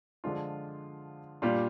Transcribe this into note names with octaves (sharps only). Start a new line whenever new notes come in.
D3 F3 G#3 D4 F4
A#2 G3 D4 F4